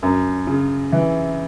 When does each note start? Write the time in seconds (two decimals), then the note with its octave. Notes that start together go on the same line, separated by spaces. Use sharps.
0.03 F#2
0.47 C#3
0.92 E3